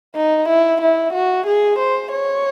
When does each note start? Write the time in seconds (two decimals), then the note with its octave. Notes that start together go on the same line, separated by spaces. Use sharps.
0.16 D#4
0.49 E4
0.82 E4
1.14 F#4
1.46 G#4
1.79 C5
2.11 C#5